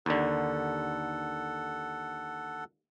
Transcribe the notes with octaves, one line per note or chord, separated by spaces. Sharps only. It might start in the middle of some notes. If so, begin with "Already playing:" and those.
D#2 D3 A4 F#5